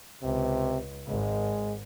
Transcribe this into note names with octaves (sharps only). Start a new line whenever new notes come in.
C#2 C3
G#1 G#3